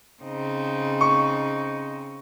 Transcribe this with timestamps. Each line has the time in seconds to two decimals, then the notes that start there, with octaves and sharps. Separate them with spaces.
0.22 C#3 C4 D#4
1.01 C#6